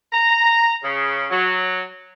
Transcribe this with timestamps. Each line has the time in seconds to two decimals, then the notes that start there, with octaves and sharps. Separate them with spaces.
0.12 A#5
0.84 C#3
1.30 F#3